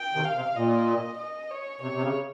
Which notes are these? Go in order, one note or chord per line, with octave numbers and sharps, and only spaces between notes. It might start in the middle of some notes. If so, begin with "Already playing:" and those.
Already playing: G5
C3 D#3
F5
C3
A#2 D#5
D#5
C#5
C3 C#5
C3
C#3